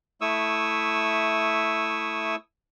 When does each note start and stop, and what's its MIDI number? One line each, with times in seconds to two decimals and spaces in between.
0.21 2.36 57
0.21 2.36 64
0.21 2.36 85
0.21 2.36 87
0.21 2.36 88